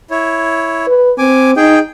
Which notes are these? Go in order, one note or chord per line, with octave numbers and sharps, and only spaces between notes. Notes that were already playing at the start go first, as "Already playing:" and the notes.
E4 C#5
B4
C4 G#5 D6
D#4 G#4 G5